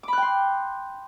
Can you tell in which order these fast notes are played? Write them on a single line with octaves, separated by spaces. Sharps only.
D6 B5 F#6 G5 C6